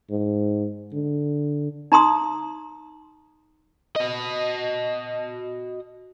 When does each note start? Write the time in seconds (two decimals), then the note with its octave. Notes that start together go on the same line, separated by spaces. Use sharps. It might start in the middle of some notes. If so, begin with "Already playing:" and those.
0.10 G#2
0.93 D3
1.92 D#4 A#5 C6 D#6
3.96 F#4 D#5